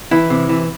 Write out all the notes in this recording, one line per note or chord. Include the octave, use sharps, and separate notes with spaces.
E3 E4
C3
E3